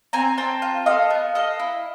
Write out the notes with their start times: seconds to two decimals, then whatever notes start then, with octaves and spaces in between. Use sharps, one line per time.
0.13 C4 G#5 A#5
0.37 C4 G5 A5
0.62 F4
0.86 A4 D#5 F5
1.10 B3
1.35 A4 D#5 F5
1.59 E4